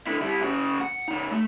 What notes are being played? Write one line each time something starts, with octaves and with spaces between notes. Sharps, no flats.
D3 E4
G3 E4
C#3 F#4
F#5
C#3 D#4
A3